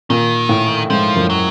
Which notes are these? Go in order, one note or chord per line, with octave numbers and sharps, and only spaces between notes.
A#2 D#3
A2
G#2 F3
F#2
F#3